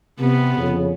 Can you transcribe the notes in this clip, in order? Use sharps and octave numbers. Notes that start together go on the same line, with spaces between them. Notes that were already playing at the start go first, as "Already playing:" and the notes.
C3 B3
F2 C#3